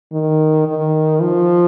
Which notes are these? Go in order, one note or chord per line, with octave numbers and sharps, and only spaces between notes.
D#3
D#3
F3